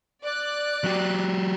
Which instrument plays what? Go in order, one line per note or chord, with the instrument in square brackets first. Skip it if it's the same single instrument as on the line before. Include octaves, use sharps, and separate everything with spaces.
[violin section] D5 F#6
[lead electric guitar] F#3 G4